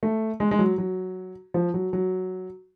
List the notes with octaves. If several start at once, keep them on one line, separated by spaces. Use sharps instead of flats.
A3
G#3
G#3
F#3
F#3
F3
F#3
F#3